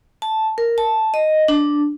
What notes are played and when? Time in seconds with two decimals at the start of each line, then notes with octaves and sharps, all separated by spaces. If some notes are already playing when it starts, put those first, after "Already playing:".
0.22 A5
0.58 A#4
0.78 A5
1.14 D#5
1.48 D4